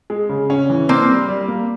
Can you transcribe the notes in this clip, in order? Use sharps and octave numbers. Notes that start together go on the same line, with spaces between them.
G#3
C#3
C#4
E3
A#3 C4 D4
G3
G3
A#3